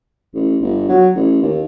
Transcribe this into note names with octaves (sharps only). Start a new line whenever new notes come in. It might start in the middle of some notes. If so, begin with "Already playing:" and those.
A1
G1
F#3
A1
D#2